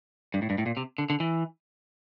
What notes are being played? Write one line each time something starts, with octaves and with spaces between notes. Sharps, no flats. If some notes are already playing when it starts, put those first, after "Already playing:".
G2
A2
G2
A2
A#2
C3
D3
D3
E3